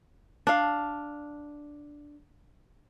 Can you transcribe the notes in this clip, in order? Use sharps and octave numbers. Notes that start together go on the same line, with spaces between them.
D4 F5